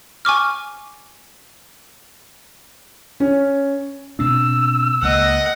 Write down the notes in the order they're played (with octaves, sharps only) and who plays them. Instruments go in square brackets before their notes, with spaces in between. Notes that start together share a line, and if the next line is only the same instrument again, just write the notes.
[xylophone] G#5 C#6 D6 F6
[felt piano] C#4
[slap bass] B2 C4 D4 [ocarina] E6
[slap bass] C#2 A3 A#3 [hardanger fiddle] D#5 F#5